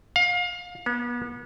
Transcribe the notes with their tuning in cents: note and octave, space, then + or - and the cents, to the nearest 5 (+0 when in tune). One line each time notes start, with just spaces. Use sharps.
F5 +30
B3 -35